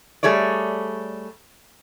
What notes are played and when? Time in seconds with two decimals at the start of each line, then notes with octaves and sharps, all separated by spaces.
0.23 G3 A3 G#4 C#5 D5